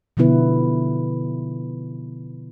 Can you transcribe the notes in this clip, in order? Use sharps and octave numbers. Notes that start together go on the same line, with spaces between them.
B2 D3 F3 B3 E4 B4